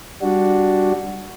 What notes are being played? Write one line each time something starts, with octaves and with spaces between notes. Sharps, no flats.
G3 D4 F#4